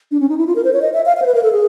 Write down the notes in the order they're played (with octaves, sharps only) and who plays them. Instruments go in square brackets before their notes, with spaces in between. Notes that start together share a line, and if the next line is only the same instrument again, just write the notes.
[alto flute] D4
C#4
D#4
E4
F4
A#4
C5
C#5
D#5
E5
F5
F5
C5
B4
A#4
A4
G#4